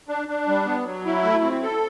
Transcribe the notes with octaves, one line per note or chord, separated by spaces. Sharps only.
D4
D4
G3
B3
F#3
E4
A3
C4
A4